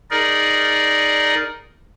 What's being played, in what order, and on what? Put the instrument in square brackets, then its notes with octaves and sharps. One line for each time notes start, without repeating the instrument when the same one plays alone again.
[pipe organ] D#4 G#4 A#4 D5 D#5